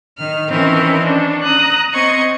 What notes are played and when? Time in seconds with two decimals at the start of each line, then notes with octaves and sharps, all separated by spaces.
0.17 D#3 F6
0.50 D#3 E3 C4 C#4 A#4
1.01 C#4 D4
1.44 A#5 D#6 F#6
1.93 C4 D#5 C#6 G#6